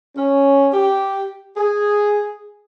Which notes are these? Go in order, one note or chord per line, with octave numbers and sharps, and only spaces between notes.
C#4
G4
G#4